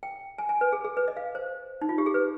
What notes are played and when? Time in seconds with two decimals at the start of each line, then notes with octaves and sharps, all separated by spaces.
0.03 G5
0.38 G#5
0.49 G#5
0.61 B4
0.73 G#4
0.84 G#4
0.97 B4
1.08 D#5
1.17 F5
1.35 C5
1.81 D#4
1.89 F4
1.98 G4
2.06 G#4
2.14 B4